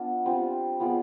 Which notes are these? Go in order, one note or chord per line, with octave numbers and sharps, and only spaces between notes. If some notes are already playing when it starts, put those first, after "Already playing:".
Already playing: B3 D4 F4
G3 C4 F4
B3 F4 G#4 D5